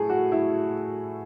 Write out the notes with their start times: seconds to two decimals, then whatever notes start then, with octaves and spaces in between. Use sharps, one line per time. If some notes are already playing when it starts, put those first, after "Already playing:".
Already playing: A2 G#4 A4
0.09 F#4
0.32 E4